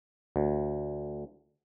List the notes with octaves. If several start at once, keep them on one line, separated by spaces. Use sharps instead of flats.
D2